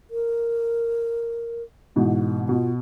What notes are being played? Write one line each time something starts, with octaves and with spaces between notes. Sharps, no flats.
A#4
G#2 B2 E3 B3
B2 F4